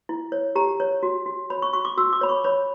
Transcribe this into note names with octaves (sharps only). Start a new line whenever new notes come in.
E4
C#5
G4 A#5
C#5
F#4
F#4
C#5 B5
C#6
F#4 C#6
D6
F#4 E6
D6
C#5 B5
C#6
C#5 B5